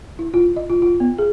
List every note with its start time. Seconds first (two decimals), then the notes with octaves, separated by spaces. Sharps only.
0.19 E4
0.34 F4
0.56 D#5
0.70 F4
0.82 F4
1.00 B3
1.18 G#4